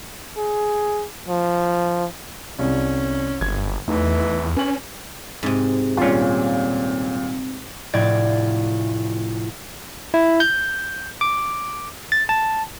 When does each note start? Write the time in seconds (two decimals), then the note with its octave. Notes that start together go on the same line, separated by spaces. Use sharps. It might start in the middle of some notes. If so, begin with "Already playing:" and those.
0.37 G#4
1.28 F3
2.59 C2 G3 C#4
3.41 G1 G#6
3.88 E2 E3 A3 D#4
4.57 C#4 B4 G#5 F#7
5.43 G#2 C3 C4
5.97 D#1 A#2 C4 C#4 F4
7.93 F1 A2 D5 G#6 A6
10.14 E4
10.40 G6
11.21 D6
12.12 A6
12.29 A5